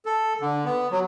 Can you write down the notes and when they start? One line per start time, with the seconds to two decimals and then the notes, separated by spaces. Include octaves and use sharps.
0.05 A4
0.41 D3
0.65 B3
0.92 F#3